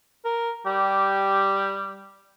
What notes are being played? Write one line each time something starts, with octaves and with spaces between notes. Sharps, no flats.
A#4
G3 G4